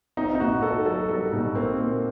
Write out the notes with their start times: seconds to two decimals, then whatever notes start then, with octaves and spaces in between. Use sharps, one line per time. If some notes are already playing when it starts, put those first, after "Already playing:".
0.17 C4 D#4
0.35 D#4
0.40 A#2 F#4
0.63 F#4 A4
0.86 F#3 A4
1.09 G3 A4
1.32 A#1 D#4
1.55 A#3 C4
1.79 A#2